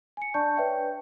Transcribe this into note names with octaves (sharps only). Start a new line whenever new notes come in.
G#5 C#7
D4 D5 A5 C#6 G6
B4 C#5 D5 E5 G5